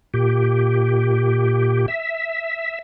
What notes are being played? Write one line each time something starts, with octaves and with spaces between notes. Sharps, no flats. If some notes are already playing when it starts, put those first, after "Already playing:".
A#2 G4
E5